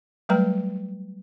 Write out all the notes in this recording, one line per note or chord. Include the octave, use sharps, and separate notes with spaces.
F#3 G3 A3 B4 G5 A#5